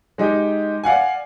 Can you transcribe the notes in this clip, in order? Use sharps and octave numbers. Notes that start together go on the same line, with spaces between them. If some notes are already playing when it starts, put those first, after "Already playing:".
G#3 D#4 G4
D5 F5 F#5 G#5